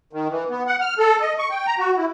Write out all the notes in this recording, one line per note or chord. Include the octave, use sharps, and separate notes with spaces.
D#3
E3
B3
F#5
F6
A4
D#5
C#6
G5
A#5
F#4
E4